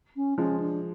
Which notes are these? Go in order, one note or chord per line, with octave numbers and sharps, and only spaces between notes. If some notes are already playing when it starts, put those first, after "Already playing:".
C#4
F3 G#3 C#4
D4